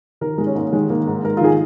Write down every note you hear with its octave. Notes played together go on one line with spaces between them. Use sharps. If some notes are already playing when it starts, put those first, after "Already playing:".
D#3 A#4
G#2 G#3
C#4
G#2 A#3
D#3 G#3
D#3 A#3
G#2
G#2 A#4
F4
D#3 G#4